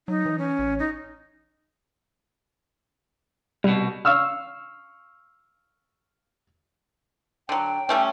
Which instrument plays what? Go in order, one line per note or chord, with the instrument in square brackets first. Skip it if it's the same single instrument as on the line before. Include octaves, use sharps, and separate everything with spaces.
[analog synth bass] F#3 [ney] D#4
[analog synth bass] E3
[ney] C#4
[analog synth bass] A1
[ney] D#4
[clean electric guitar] C2 B2 [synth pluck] G3
[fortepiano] F5 C#6 E6 F6
[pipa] D3 F#3 [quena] G5
[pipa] G3 A3 C#4